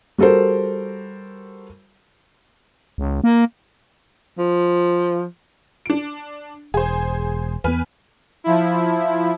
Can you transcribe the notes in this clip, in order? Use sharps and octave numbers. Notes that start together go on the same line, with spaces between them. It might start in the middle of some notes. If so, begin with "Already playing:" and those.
G3 F#4 A4 A#4 C5
C#2
A#3
F3
D4 D7
E1 G#4 C5
E2 B3 B4 G#5 F6
F3 E4